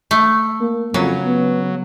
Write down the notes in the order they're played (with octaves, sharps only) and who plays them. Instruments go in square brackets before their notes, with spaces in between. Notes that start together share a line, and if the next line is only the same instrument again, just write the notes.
[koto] A3
[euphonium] A#3
[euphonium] F2 [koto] C#3 [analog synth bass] F#3
[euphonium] B3